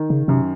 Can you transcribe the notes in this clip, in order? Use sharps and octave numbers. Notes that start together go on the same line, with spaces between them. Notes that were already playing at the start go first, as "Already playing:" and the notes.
Already playing: D#3
C#3
F#2 C3